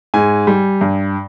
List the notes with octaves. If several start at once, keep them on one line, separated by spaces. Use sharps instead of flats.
G#2 G#5
G3
G2